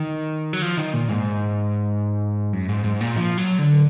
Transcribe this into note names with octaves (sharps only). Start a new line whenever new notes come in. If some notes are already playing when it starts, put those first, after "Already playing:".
Already playing: D#3
F#3
F3
D#3
A#2
G#2
F#2
G#2
G#2
A#2
F3
F#3
D3